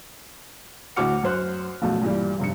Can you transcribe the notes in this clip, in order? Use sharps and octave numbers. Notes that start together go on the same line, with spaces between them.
D2 A2 F#4 D6 F6 C#7
F#2 C5 F#6
A#1 F#2 B2 A3
G2 A#2 E3 G3
F1 G2 C#7